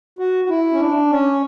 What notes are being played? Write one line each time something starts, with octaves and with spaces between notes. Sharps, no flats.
F#4
F#4
E4
C#4
D4
C#4